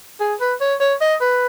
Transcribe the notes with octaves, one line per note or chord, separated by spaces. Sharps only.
G#4
B4
C#5
C#5
D#5
B4